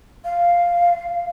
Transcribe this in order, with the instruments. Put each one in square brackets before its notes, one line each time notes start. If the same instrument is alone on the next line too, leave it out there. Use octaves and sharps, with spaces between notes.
[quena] F5